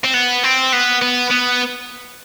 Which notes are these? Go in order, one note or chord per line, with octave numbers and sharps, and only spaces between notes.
C4
B3
C4
B3
B3
B3